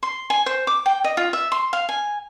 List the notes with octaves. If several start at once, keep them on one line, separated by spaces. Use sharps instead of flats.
C6
G#5
C5
D6
G5
D#5
F4
E5
C6
F5
G#5